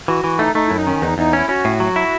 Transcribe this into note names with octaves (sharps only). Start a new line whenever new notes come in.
E3 F#4
E3
A3 D#4
A3 D#4
F#2 E4
D#4
D#3 C#4
E2 D#4
E2 D#4
C#4 E4
C#4 F#4
A2
F#3
E4